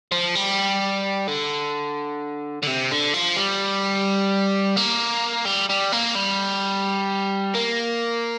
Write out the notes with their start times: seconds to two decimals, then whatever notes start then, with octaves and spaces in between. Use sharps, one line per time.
0.12 F3
0.35 G3
1.28 D3
2.63 D3
2.67 C3
2.91 D3
3.14 F3
3.37 G3
4.77 A#3
5.46 G3
5.70 G3
5.92 A#3
6.15 G3
7.55 A#3